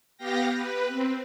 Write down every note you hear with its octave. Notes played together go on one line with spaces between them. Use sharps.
B3 G4 F5 G5 A#6
B4
C4